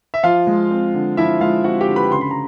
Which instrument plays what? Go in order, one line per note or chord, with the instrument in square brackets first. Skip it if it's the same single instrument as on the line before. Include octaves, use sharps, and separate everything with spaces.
[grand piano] E5
F3 F4 F5
G#3
C4
D3
F3 E4 E5
G#3 F4 F5
C4 F#4 F#5
G4 G5
D3
B4 B5
C#3 C6
B5
A#5